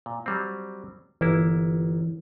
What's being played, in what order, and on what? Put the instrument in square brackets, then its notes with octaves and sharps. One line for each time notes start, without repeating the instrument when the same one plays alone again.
[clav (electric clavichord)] A#2
F#3 G3 C4
[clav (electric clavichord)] G1 A#3 E4 [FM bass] E3